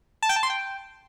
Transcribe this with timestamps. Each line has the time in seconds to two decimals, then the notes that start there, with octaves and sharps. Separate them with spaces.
0.22 A5
0.29 G5
0.36 A5
0.43 C6
0.50 G5